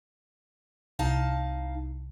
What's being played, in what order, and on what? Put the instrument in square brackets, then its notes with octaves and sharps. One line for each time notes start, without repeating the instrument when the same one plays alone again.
[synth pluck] C2 [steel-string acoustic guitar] D#4 F5 A5